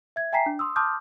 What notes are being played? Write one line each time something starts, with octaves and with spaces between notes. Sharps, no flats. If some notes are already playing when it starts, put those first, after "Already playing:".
E5 G#6
E5 G5 G#5 A#5 B6 C7
D4
C6 D#6 E6
A5 C6 D6 D#6 F6 G6